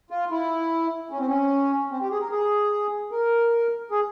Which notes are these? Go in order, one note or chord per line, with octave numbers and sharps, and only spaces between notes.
F4
E4
C#4
C4
C#4
C4
G4
G#4
A#4
G#4
A#4
G#4